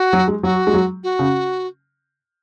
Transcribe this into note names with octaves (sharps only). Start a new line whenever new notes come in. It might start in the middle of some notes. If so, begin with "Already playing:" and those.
Already playing: F#4
F#3
G#3
F#3 F#4
G#3
F#3
F#4
C#3